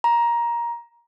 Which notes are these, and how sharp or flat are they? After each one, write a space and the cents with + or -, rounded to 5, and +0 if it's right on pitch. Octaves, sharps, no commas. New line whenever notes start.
A#5 +15